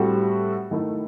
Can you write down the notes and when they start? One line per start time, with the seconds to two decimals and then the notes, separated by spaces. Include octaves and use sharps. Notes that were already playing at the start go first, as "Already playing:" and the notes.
Already playing: A2 G3 C4 F#4 A4
0.71 D#3 A3 E4 A4